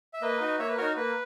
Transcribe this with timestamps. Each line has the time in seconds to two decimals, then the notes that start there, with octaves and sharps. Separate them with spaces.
0.14 E5
0.22 A#3 B4 D#5
0.40 D#4 F#4
0.59 A#3 C#5 E5
0.68 B4
0.77 D#4 F#4 A#4 C#5
0.96 A#3 B4